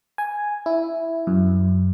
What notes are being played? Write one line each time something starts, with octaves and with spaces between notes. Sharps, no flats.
G#5
E4
F#2